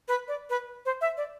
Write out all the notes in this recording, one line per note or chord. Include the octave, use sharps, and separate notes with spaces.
B4
D5
B4
C5
E5
D5